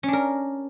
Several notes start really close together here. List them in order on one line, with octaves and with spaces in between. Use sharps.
C#4 D4 A#4